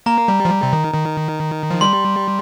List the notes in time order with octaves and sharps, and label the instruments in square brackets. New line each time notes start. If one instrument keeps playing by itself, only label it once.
[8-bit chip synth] A#3 [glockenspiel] A#5
[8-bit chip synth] G3
F3
G3
C3
D#3
D#3
F3
[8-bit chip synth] G3 [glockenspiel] C6